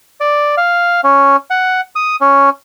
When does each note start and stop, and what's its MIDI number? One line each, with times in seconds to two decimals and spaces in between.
0.20 0.55 74
0.57 1.01 77
1.04 1.36 61
1.50 1.81 78
1.96 2.16 87
2.21 2.50 61